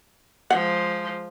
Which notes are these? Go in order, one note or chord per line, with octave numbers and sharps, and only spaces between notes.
F3 G#3 F#5